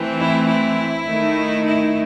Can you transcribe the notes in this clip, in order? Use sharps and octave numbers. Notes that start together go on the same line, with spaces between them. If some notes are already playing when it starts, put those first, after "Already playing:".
Already playing: E3 A3 C4
E4
E4
D#3 A3 D#4
E4